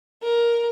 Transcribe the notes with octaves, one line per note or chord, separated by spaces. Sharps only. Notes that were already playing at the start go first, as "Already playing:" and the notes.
A#4